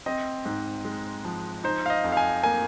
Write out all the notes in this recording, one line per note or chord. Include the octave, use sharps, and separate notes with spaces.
C4 D#5
G#2
G#3
F3
D#4 C5
F5
D#5
F2
F5
G#5
A#3 G#5